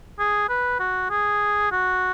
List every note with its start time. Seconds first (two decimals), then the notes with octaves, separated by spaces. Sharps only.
0.19 G#4
0.49 B4
0.80 F#4
1.11 G#4
1.72 F#4